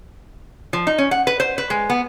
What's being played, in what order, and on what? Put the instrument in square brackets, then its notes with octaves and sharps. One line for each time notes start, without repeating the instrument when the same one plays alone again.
[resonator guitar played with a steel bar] F3
D#4
C#4
F#5
B4
C5
B4
G#3
B3